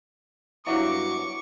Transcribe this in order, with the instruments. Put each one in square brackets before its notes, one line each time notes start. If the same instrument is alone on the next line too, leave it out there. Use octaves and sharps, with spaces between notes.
[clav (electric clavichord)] G2 F#3 B3 [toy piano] E4 E5 F5 [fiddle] C#6 [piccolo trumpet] D6